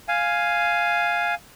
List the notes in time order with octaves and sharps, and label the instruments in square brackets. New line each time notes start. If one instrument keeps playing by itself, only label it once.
[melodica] F5 G#5